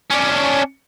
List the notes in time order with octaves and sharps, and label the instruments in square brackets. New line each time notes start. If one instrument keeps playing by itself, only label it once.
[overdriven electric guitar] C#4 D4